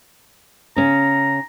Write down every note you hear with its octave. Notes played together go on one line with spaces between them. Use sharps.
C#3 C#4 A#5